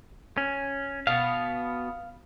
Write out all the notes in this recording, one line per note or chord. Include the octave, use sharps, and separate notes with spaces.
C#4
B2 B3 F5